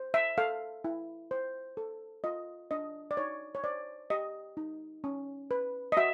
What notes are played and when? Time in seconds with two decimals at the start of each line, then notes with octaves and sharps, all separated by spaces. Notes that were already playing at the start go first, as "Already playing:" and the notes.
Already playing: C5
0.14 E5
0.38 A4 F5
0.84 E4
1.31 C5
1.77 A4
2.24 F4 D#5
2.71 D4 D#5
3.11 D5
3.17 D#4 C#5
3.55 C#5
3.64 C5 D5
4.10 G4 D#5
4.57 D#4
5.04 C#4
5.51 B4
5.92 D#5
5.97 F#4 E5